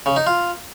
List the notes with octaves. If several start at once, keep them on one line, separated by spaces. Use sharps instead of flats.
C#3
D#4
F4